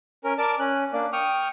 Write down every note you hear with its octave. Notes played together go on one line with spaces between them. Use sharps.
C#4 A#4
A#4 D5 A5 D6
C#4 F#6
A#3 D4 D5
G5 C#6 D#6 F6